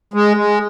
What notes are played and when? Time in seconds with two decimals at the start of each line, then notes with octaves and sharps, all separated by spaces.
0.14 G#3
0.37 G#3